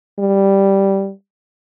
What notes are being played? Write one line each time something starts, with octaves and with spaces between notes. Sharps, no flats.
G3